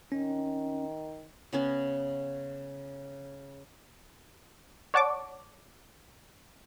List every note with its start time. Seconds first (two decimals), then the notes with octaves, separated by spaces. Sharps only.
0.12 D#3 C#4
1.53 C#3 B3 C#4
4.94 C#5 D5 F#5 A5 C#6 D6